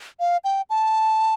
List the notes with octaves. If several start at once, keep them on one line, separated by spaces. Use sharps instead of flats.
F5
G5
A5